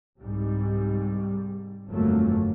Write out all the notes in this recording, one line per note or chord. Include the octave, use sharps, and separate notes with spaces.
C2 G#2 G3
G1 F2 A#2 F#3 A3 A#3